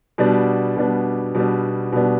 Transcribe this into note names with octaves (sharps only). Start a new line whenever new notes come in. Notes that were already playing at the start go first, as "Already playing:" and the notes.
B2 G3 B3 D4
B2 G3 B3 D4
B2 G3 B3 D4
B2 G3 B3 D4